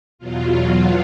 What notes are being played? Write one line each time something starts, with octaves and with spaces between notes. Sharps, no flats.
E2 B2 F#3 F4